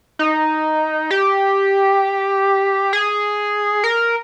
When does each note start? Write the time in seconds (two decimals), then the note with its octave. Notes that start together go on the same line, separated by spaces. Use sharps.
0.19 D#4
1.11 G4
2.93 G#4
3.84 A#4